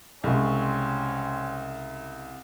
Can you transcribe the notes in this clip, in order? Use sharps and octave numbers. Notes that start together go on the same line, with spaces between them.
C2 C#3 G#3 C4 C#4